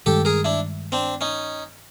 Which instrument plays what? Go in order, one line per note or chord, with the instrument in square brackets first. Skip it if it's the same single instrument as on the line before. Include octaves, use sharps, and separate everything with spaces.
[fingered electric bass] G2 D#3 G#3 [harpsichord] G4 A4
[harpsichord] G#4 A#4
D4 E4
C4 D4
C#4 D#4